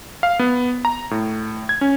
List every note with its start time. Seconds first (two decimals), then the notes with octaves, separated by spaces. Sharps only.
0.23 F5
0.39 B3
0.85 A#5
1.11 A2
1.69 G#6
1.81 C#4